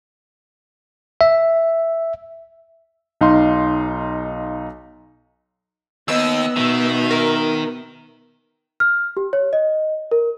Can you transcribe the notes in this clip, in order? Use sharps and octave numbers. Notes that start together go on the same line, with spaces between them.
E5
B1 D#4 F5 C6
D#2 B3 D#5 E6
B2 D#3 E5
A#4
F6
G4
C#5
D#5
A#4